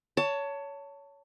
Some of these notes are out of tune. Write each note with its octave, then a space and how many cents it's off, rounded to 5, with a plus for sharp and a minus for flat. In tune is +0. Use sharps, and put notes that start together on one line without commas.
C#5 +20 A5 +20